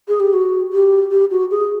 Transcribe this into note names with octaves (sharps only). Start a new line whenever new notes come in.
G#4
G4
F#4
G4
G4
F#4
G#4